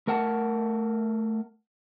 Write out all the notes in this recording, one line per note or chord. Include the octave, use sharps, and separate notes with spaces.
A3 A#4 F#5 A5